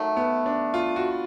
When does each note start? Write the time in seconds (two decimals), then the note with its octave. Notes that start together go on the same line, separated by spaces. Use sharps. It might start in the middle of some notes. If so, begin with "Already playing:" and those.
Already playing: D#3 F#3 A3
0.17 B3
0.46 D4
0.74 F4
0.96 F#4